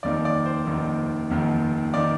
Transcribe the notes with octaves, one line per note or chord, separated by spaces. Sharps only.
F1 D#2 D#3 D5
D5
C5
F1 D#2 D#3
F1 D#2 D#3
D#3 D5